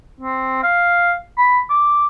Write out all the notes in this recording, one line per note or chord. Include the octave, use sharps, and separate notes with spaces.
C4
F5
B5
D6